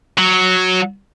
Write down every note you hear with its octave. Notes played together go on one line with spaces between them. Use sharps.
F#3